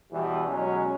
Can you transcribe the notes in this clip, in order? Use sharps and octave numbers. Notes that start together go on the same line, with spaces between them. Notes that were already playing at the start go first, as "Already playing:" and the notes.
E2 B2 E3 G3
B2 F#3 G#3 C#4